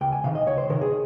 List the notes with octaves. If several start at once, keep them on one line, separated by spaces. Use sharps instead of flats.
C#2 G5
G#5
C3 D#3 F5
D#5
C#2 C#5
C5
C3 D#3 A#4
G#4